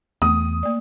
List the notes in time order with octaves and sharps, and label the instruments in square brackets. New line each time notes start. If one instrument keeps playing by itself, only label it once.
[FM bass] E2 [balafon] A3 [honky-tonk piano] D#6
[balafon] A#3 D5